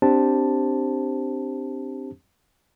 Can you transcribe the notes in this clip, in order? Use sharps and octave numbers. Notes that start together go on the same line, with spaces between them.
C4 D4 G4 C5 A5